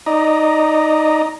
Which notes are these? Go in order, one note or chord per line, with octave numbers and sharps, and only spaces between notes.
D#4 D5 D#5 A#5